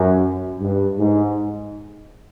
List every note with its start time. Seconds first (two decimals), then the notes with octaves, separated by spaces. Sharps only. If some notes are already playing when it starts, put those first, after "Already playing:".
Already playing: F#2
0.59 G2
0.97 G#2